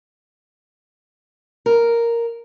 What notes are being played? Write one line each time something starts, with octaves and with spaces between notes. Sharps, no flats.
A#4